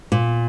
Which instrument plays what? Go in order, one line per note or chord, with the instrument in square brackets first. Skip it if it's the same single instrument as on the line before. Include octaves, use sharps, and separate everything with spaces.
[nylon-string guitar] A#2